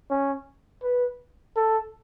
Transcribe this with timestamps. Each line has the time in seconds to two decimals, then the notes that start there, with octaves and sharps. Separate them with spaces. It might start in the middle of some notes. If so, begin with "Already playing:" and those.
0.11 C#4
0.83 B4
1.56 A4